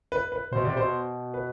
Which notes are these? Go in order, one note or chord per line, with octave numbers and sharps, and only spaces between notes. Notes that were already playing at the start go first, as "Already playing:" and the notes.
B4
B4
B2 C5
C3 D5
B2 C5
B4